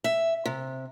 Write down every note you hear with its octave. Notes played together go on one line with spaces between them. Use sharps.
E5
C3